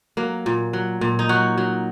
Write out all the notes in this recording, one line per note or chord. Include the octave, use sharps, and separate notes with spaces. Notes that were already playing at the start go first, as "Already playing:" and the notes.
F#3 A#3
A#2
F#3
A#2
D#4
F#3 F#4
F#3